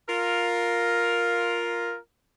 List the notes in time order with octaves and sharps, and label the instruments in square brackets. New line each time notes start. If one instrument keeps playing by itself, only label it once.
[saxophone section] F4 A#4